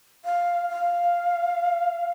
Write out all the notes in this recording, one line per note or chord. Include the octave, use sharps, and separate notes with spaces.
F5
F5